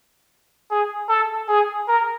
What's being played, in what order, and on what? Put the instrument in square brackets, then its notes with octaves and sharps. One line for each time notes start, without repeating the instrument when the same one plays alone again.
[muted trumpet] G#4
A4
G#4
A#4